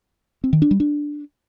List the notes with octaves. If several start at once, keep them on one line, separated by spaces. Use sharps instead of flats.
C4
D#3
D4
G3
D4